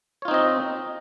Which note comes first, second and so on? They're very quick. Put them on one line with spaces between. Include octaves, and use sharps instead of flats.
C#5 F4 D#4 C4 D#5